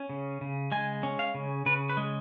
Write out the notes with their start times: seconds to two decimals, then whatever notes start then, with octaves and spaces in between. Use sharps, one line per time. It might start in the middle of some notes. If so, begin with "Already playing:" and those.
Already playing: C#4
0.09 C#3
0.41 C#3
0.72 G#3 G#5
1.03 C#4
1.19 F5
1.34 C#3
1.66 C#3 B4
1.90 B4
1.97 G#3